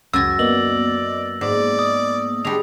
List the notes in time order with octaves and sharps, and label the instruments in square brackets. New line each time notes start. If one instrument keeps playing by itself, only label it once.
[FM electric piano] C#2 [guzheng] F#2 G#5 [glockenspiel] E6 A6 A#6
[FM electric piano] A#3 B3 D#5 [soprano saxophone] D5 [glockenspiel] F#7
[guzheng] G#2 [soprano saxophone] D5
[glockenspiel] D#6
[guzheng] G3 G#3 [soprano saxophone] D4 [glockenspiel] F7